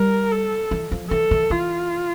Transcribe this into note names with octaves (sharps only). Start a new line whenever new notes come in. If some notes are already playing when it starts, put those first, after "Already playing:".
Already playing: G3 A#4
A4
E3
F3
E3 A4
E3
E3 F4